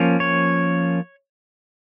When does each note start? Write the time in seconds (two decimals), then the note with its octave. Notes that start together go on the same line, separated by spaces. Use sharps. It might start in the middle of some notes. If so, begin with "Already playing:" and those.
Already playing: F3 A#3 C#4
0.20 C#5